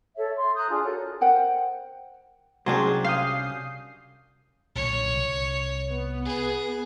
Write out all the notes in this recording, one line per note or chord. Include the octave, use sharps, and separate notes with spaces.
A4 C#5 E5
C6
A#5 D#6 F#6 G6
D4 F4 G#4
F#4 A4 A#4 C#5
A#4 C5 F#5 G5
C2 F#3 C#4 D4 G#4 G5 C6
F5 D#6 G6 C7
B1 A#2 D3 C#5
C2
B3
G#4